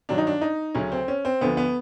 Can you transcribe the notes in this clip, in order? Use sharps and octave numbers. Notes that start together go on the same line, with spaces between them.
G2 D#3 F#3 D4
D#4
D4
D#4
D2 C#3 F#3 C#4
C4
C#4
C4
D2 D3 F3 B3
B3